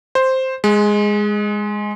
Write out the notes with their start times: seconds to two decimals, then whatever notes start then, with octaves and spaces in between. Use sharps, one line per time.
0.15 C5
0.64 G#3